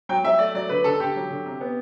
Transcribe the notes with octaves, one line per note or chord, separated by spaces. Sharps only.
F#3 G5
F#3 E5
A3 D5
F#3 D5
D3 B4
D3 A4
D3 G4
F#3
D3
C3
B3